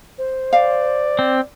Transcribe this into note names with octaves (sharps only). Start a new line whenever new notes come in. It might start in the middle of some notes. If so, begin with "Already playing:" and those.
C5
D5 F5
C4